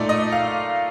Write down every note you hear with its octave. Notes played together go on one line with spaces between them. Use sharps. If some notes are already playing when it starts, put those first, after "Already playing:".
Already playing: A#2 A3 D#4 D5
D#5
F5